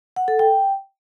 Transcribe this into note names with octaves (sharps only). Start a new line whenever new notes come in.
F#5
A4
G5